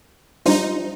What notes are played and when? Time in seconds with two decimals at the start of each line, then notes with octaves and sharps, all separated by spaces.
0.46 G3 D4 D#4 F4 C5